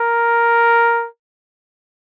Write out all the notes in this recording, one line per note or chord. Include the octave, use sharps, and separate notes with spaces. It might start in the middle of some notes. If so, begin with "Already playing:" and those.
Already playing: A#4